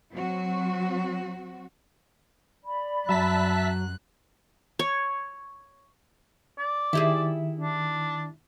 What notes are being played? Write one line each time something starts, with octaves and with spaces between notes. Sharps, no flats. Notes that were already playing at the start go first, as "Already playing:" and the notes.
F#3 C4 F#4
D5 B5
F#2 F#3 E5 A5 F#6 B6
C#5
D5
D#3 E4 G4 G#4
D4